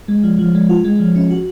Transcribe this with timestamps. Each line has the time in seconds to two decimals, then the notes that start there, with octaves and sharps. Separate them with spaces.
0.08 G#3
0.24 F3
0.39 F3
0.55 G#3
0.69 F4
0.84 G#3
1.00 F3
1.16 C#4
1.30 F#4